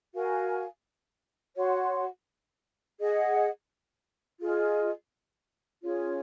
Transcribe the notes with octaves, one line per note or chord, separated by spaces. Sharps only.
F#4 A#4 F5 G#5
F#4 C#5 F#5 C6
G#4 D#5 F#5
F4 G#4 D#5
C#4 F4 G#4 C#5